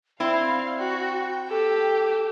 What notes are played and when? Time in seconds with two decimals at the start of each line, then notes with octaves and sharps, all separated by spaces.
0.20 C4 E4 D5 F5
0.78 F#4 G5
1.49 G4 A4